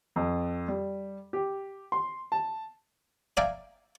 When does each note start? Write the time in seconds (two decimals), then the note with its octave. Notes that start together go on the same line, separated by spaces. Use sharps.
0.16 F2
0.68 G3
1.33 G4
1.92 C6
2.32 A5
3.37 D5 E5 F5 G5 G#5 A#5